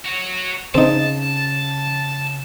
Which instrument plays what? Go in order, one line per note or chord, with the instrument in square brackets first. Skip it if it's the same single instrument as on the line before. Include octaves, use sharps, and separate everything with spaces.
[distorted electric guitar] F#4 C#5
[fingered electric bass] C#3 [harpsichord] C4 D#4 [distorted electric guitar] A5